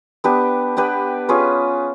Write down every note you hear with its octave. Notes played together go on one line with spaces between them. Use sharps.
B3 D4 G4 B4
B3 D4 G4 B4
C#4 F4 G#4 B4